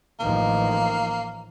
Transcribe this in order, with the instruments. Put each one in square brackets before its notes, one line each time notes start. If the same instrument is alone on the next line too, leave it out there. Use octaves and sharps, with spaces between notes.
[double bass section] A1 D#3 F3 [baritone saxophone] A#3